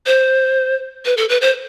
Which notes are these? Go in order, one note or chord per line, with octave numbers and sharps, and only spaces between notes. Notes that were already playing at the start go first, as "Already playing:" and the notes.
C5
B4
A4
B4
C5